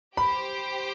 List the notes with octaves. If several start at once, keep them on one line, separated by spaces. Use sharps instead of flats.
G4 C5 G5 B5